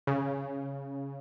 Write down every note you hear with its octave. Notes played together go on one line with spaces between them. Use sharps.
C#3